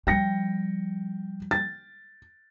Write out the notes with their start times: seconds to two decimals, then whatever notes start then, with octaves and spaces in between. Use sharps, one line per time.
0.07 F3 G3 G5 A#6 C#7
1.51 A6